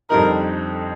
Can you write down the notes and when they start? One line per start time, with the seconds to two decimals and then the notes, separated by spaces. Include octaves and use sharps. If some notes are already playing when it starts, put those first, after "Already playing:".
0.10 F2 D3 G3 C4 D#4 A#4